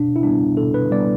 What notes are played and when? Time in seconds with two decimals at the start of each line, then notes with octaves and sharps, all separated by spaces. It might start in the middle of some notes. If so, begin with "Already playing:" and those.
Already playing: B2 D4
0.16 E4
0.23 G3 B3 D4
0.57 B2 A4
0.74 B4
0.91 G3 B3 D5